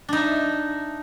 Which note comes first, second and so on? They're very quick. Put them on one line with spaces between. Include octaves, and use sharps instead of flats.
D4 D#4 E5